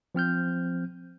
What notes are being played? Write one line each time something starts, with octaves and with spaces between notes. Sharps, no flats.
F3 C4 F6 G6